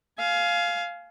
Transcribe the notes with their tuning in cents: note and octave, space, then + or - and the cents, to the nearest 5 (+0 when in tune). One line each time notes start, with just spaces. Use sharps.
F5 +0 G#5 +30